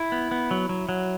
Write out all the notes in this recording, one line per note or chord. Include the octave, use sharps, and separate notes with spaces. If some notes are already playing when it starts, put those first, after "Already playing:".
Already playing: E4
B3
B3
F#3
F#3
F#3